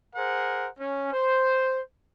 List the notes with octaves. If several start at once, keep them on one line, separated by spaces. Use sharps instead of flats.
G#4 A#4 C5 F#5
C#4
C5